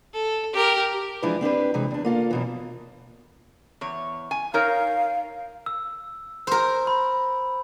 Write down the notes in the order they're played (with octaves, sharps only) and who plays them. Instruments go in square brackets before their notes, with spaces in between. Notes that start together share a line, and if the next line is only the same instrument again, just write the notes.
[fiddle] A4
G4 A#4
[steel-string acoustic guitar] E3 F3 G#3 D4 E4 B4
C4 D4 G4 B4
C3 E3 G#3
E2 D4
A#3 F4 A4
F#2 B2 E3
[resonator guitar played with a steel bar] E2 C#5
G#5
[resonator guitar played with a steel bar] D#4 A#4 C#5 [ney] F5
[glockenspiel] E6
[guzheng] A#4 C5
[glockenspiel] B5